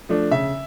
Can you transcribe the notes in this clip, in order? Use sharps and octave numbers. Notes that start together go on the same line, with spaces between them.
F3 A3 D4
C#3 E5